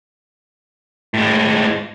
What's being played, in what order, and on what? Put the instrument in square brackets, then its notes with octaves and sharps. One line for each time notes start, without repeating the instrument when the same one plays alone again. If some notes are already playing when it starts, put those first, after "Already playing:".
[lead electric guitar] A2 G#3